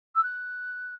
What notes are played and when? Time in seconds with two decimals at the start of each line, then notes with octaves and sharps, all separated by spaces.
0.15 E6
0.23 F#6